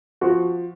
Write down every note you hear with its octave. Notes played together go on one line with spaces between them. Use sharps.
F3 F#4